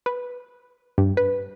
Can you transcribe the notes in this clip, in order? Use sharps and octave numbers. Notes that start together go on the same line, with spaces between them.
B4
G2
B4